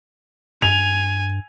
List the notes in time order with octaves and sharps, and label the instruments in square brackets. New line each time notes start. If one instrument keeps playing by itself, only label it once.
[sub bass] G2 [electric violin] G#5 [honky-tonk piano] F7